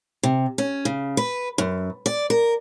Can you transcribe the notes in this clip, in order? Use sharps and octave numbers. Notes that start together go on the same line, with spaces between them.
C3
C#4
C#3
B4
F#2
D5
A#4